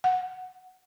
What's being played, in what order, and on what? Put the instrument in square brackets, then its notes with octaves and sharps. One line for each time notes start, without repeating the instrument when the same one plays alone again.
[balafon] F#5